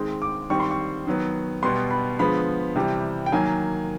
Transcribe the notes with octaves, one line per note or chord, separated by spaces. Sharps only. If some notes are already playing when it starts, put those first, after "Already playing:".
Already playing: D#3 G#3 C4
D6
D#3 G3 C4 C#6
C6
C#6
D#3 F#3 B3
B2 G3 B3 C6
B5
D3 F3 G#3 B3 B5
C3 E3 G3
G5
D#3 F#3 A#3 G#5